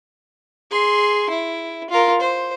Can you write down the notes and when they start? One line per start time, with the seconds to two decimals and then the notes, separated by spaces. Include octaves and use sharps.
0.71 G#4 C6
1.29 E4
1.90 F4 A#4
2.20 C5